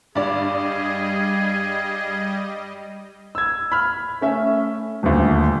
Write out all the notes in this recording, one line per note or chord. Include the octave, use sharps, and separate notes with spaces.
G2 G3 G#4 D5 D#5
E6 G#6
B5 F6
A3 C#4 E5
D#1 D2